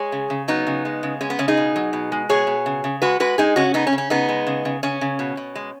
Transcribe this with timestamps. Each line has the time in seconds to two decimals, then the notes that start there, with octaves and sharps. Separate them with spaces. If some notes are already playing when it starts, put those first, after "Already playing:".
Already playing: G#3 G#4 C#5
0.12 C#3
0.30 C#3
0.48 F#3 B3 D#4
0.67 C#3
0.85 G#3
1.03 C#3
1.21 G#3 C#4
1.30 B3
1.39 C#3 C#4
1.48 D#4 G#4
1.57 B2
1.76 F#3
1.93 B2
2.12 G#3
2.29 B2 G#4 C#5
2.47 B2
2.66 C#3
2.84 C#3
3.02 G#3 F#4 B4
3.20 G#3 F#4 B4
3.38 G#3 D#4 G#4
3.56 C#3 C#4 F#4
3.74 C#3 B3 D#4
3.87 C#4
3.93 C#3
3.98 C#4
4.10 C#3 B3 D#4
4.29 G#3
4.47 C#3
4.65 C#3
4.83 C#3 C#4
5.01 C#3
5.19 B2
5.37 B2
5.55 G#3